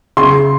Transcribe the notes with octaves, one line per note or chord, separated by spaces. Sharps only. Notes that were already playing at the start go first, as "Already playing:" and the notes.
C#3 C6